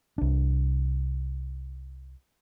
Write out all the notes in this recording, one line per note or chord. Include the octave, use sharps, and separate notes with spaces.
C2 D4